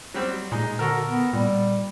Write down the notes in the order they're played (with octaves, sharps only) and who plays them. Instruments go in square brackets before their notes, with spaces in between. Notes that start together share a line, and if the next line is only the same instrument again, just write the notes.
[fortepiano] F#3 G3 C4
[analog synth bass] A#2 [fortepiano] G#3 D#4
[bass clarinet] D3 [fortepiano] F#4 A4 A#4
[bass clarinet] B3
[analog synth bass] A#2 [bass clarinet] G3